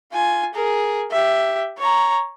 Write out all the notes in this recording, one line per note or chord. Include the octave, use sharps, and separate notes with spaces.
F4 G#5
G#4 A#4
G4 E5
C#5 A#5